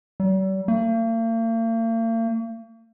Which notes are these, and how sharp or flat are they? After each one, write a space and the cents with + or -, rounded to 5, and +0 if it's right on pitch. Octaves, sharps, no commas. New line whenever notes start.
G3 -45
A#3 -45